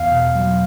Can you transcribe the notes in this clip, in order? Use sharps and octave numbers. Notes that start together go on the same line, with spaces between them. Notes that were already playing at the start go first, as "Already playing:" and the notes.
Already playing: E2 F5
B2
F#3